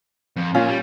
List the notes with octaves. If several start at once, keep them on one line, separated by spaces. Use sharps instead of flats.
F2
A#2 C#4 F4
G3